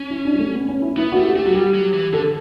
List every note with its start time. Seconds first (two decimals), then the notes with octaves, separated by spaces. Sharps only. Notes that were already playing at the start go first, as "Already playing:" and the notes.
Already playing: C#4
0.10 E4
0.25 D4
0.33 G3
0.39 A3
0.54 B3
0.68 C#4
0.82 E4
0.97 B3 E4
1.12 F#4
1.17 A3 G4
1.35 A3 G4
1.45 F#3 F#4
1.54 G3 G4
1.74 F#3
1.94 E3
2.13 D3 A4